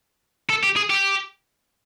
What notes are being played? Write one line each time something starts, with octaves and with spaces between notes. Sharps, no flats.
A4
G4
G#4
G4